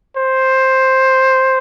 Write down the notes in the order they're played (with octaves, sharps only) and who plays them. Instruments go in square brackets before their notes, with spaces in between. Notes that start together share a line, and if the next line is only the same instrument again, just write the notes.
[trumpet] C5